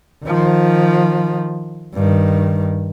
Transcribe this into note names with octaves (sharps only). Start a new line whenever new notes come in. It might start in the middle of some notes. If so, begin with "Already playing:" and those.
D#3 F3
G2 D#3